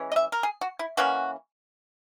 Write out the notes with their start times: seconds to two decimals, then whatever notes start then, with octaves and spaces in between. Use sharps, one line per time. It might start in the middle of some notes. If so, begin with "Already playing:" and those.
Already playing: E3 G#3 C#4
0.12 D#5
0.16 E5
0.32 A#4
0.43 G#4
0.61 F#4
0.79 E4
0.97 E3 A#3 C#4 F#4